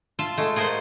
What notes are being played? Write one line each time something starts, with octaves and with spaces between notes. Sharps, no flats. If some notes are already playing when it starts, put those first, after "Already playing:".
F4 E5 A5
G#3 A3
F4 G#4 A#4 C5 F#5